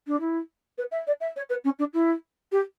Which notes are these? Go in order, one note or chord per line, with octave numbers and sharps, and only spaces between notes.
D4
E4
B4
E5
D5
E5
C#5
B4
C#4
D4
E4
G4